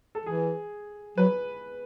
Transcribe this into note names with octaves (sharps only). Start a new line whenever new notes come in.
A4
E3 G#4
F#3 B4